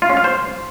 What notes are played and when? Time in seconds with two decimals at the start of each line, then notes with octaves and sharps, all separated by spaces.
0.02 F4
0.09 C#4
0.17 F5
0.24 C5